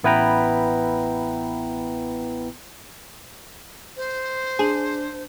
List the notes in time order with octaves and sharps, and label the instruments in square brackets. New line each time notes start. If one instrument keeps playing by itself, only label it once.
[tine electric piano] A1 B3 E4 B4 G5 A#5
[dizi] C5
[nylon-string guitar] D4 [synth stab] G#4